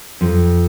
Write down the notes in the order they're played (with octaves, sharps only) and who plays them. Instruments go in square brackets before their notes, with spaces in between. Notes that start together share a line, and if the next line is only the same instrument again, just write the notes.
[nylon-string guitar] F2